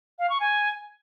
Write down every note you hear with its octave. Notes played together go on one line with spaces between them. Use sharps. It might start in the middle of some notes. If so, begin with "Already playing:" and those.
F5
C#6
G#5